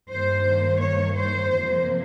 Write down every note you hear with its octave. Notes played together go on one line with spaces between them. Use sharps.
G2 D#3 A#3 C5
C#5
C5
F2 C3 F3 A#3